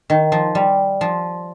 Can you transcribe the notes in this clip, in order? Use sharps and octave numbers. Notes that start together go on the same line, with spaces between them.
D#3
F3
G3
F3